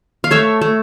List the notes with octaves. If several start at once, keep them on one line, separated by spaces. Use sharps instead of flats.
F5
A3 C#5 E5
A3